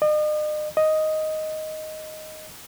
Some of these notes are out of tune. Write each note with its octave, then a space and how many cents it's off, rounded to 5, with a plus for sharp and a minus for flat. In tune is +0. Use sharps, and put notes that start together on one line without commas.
D#5 -40
D#5 +5